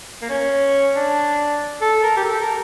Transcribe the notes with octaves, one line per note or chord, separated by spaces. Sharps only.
A#3
C#4
D4
A4
A#4
G4
A4
A#4